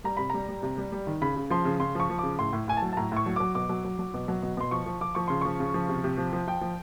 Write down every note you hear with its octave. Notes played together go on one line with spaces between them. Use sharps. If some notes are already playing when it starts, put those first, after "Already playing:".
G3 A#5
C3 B5
G3 A#5
G3
C3
G3
G3
D#3
C#3 B5
C#3
F3 C6
C#3
C#3 C6
F3 C#6
F3
C#3 D6
A2 C6
A2
A2 G#5
A5
F#3
A5
A2 A#5
A2 C#6
F#3
F#3 D6
B2 D6
F#3
F#3
F#3
B2
F#3
B2
B2 C6
F3 C#6
F3
F3 D6
F3 C#6
C#3 C6
F3 C#6
C#3
F3
C3
C3
F3
F3
F3 G5
F3